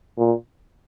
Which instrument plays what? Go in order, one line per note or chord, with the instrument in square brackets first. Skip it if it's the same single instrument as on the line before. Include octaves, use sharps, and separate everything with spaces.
[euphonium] A#2